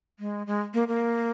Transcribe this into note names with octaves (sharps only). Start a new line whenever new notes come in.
G#3
G#3
A#3
A#3